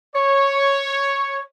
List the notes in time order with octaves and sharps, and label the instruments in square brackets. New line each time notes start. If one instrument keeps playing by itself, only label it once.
[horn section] C#5